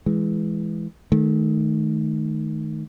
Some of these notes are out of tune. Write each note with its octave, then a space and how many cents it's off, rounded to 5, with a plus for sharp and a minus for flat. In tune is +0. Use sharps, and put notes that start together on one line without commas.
E3 +0 G#3 +0
D#3 -5 A3 -30